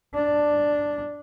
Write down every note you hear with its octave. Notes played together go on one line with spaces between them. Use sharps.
D4